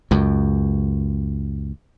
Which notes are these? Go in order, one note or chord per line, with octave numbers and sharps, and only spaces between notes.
C#2 F#2